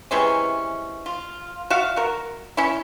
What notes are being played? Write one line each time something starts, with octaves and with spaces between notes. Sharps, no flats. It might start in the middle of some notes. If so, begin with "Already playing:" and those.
C3 E3 G#3 C#4
F4
F#4 E5 F5
F#4 A#4
C#4 E4